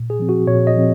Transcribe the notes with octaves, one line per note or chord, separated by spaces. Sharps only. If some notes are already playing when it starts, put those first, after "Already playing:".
Already playing: A#2
G#4
F3 C4
F#4
A#2 C#5
D#5
F3 C4